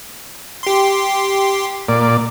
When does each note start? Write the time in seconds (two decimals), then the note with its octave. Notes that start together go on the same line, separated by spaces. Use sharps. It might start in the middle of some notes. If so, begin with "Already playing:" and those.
0.63 G4 C6
1.89 A#2 D5